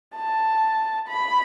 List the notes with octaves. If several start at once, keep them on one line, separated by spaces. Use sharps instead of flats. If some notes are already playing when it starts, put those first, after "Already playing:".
A5
B5